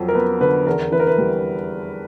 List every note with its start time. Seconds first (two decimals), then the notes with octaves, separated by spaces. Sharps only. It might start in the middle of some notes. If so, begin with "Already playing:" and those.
Already playing: F2 F3 F#3
0.08 A#4
0.15 B3 B4
0.41 D3 B4
0.67 E2 A#4
0.91 E3 B4
1.00 A#4
1.07 B4
1.18 G3